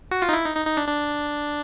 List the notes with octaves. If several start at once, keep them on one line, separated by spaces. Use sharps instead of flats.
F#4
F4
D#4
E4
D#4
D#4
D#4
D4
D4